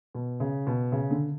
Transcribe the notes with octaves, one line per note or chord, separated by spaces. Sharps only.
B2
C#3
B2
C#3
D3